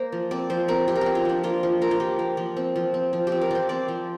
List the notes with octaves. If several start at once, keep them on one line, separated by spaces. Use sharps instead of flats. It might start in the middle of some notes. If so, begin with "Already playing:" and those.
Already playing: A#3 C5
F3
C4 D5
F3 C5
C4 A#4
F3 G4
A#4
C4 G4
F4
F3 D4
A#3 F4
F3
A#3 A#4
F4
F3 G4
A#3
F3
C4
F3
C4
F3
G4
C4
A#4
F3 C5 D5
C4 D5
F3